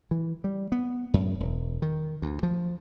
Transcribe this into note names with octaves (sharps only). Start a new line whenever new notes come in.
E3
G3
B3
F#2
E1
D#3
D2
F3